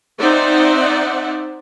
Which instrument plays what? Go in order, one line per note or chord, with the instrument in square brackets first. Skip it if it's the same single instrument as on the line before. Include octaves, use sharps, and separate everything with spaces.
[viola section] C4 D#4 C5 D5 E5 F#5